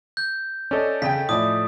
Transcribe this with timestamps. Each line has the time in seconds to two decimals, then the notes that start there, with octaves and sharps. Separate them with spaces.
0.17 G6
0.71 C#4 A4 D5 D#5
1.02 C#3 G5 B6
1.29 A2 F3 D5 D#6